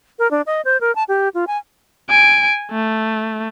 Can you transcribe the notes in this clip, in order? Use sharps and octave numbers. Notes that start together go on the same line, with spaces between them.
A#4
D4
D#5
C5
A#4
A5
G4
F4
G#5
G#5 D7
A3